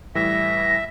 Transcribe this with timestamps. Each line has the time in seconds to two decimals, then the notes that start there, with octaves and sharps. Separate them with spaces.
0.15 A2 E3 G3 E5 A#6